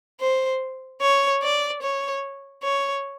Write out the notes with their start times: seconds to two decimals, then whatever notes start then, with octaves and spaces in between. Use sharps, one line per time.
0.20 C5
1.01 C#5
1.42 D5
1.82 C#5
2.63 C#5